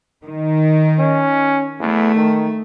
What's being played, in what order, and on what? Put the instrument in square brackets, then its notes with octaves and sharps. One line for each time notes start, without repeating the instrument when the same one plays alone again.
[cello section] D#3
[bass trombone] C#4
[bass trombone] E2 [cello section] A3
[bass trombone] D#3